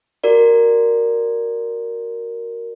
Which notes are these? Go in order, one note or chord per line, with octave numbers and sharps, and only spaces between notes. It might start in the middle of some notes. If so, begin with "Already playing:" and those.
F#4 A#4 D5